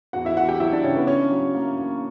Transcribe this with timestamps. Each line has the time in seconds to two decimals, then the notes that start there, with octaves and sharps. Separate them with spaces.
0.13 E2 F#4 F#5
0.25 E4 E5
0.37 E2 F#4 F#5
0.48 G4 G5
0.60 F#3 E4 E5
0.72 D4 D5
0.84 C#3 C#4 C#5
0.95 B3 B4
1.07 C#4 D4 C#5
1.31 F#3
1.54 A#3
1.78 A#3